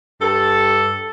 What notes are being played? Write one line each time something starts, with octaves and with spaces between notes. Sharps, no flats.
G2 A4